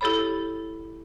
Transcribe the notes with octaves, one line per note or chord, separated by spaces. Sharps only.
E4 G4 A4 C#5 B5